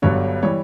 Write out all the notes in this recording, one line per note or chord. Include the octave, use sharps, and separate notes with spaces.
G1 G2 D3 F#3 C#5
E3 G3 C#5